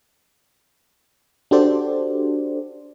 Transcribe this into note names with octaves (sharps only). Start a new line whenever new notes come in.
D4 F#4 G4 A4 C5 D5